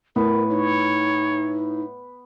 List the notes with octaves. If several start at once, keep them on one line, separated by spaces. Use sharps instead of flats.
A2 B3 A#4 B4
D#4 C#5